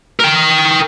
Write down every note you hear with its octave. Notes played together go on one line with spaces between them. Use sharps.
A#4 G5